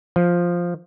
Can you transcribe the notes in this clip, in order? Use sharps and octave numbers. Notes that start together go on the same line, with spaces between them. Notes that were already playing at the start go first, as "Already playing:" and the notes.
F3